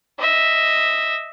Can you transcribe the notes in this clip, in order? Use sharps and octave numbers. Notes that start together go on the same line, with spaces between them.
D#5 E5